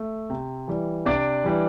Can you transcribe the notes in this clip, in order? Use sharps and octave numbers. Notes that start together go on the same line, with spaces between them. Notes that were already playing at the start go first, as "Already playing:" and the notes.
Already playing: A3
C3
E3 G3
C3 D4 D5
E3 G3